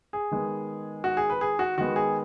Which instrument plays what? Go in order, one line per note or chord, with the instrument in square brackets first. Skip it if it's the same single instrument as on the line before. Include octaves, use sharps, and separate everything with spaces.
[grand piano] G#4
D#3 G#3 B3
F#4
G#4
B4
G#4
F#4
D#3 G#3 B3 F#4
G#4